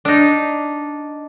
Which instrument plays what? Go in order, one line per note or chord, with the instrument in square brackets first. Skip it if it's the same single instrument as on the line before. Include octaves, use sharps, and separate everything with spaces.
[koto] D4 D#4